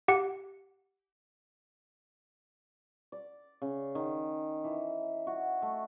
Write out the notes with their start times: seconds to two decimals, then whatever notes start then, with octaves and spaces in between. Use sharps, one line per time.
0.08 G4 F#5
3.12 D5
3.62 C#3
3.95 D#3
4.64 E3
5.27 F#4
5.62 A3